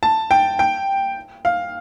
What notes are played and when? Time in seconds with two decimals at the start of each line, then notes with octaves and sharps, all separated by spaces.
0.03 A5
0.31 G5
0.59 G5
1.45 F5